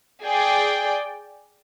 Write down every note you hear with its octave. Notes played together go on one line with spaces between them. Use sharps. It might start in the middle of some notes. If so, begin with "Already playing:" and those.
G#4 D5 G5